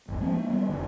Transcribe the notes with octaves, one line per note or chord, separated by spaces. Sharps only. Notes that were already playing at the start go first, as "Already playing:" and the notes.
D1 G1
F3 G#3 C4
G#3 A#3
G3 A#3 B3
F1 D3